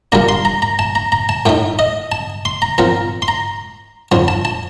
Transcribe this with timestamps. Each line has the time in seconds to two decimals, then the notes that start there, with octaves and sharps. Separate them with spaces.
0.12 A#2 G3 A#3 D4 A#5
0.29 C6
0.45 A#5
0.62 A#5
0.79 A5
0.95 A#5
1.12 A#5
1.29 A5
1.46 A2 A3 D#4 G5
1.79 D#5
2.12 A5
2.45 C6
2.62 A#5
2.78 A#2 F3 C4 A#5
3.22 C6
3.28 A#5
4.12 F2 D3 F3 A5
4.28 A5
4.45 A5